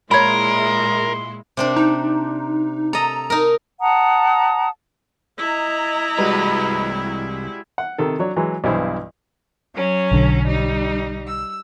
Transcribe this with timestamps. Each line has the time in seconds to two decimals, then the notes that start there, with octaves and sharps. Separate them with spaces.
0.11 A#2 G#3 E4 A#4 C#5 B5 C6
1.57 C3 C4 D4
1.76 D#4
2.93 A4 D#5 A#5
3.30 D#4 A#4
3.81 F#5 A5 A#5 D#6
5.38 E4 D#5 A#5
6.19 C2 G3 G#3 F#4 B4
7.78 F#5
7.98 C3 D#3 A4
8.19 F#3 D4 C#5
8.36 E3 F#3 G#3
8.64 B1 G2 E3 E4 C5
9.75 F#3 C#4 C#5
10.12 B1 D3
10.46 G3 D#4
11.26 E6